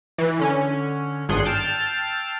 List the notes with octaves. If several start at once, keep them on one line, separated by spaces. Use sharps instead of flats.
E3
D3 C#4
G#1 D4 G#4 C6 F#6 C#7
G5 A5 E6 F6 A6 C7